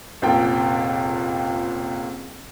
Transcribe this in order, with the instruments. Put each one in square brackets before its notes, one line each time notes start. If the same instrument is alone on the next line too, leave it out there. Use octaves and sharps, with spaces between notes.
[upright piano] F1 C#2 A#2 G5